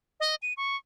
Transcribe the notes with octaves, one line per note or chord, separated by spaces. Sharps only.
D#5
D#7
C#6